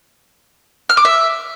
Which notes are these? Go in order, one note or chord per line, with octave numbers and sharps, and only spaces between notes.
F6
D6
E5